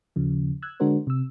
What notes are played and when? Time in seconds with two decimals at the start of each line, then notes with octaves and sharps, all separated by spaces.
0.16 D#2 C#3 F3
0.62 E6 F#6 G#6
0.80 D3 G#3 D4 F#4 A#4 C5
1.07 C3 E6